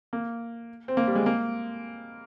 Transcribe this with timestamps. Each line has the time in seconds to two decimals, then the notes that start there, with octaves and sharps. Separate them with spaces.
0.13 A#3
0.88 C4
0.97 A#3
1.07 G3
1.15 G#3
1.26 A#3